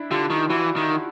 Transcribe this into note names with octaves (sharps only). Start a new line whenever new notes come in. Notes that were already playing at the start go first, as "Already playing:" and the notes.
Already playing: D4 E4
D3 F4 G4
D#3
E3 E4 F#4
D#3